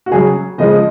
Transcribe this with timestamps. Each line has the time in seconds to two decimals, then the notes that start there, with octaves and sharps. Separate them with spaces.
0.06 F#4
0.11 C#3 F#3 G#4
0.58 C#3 F3 G#3 D#5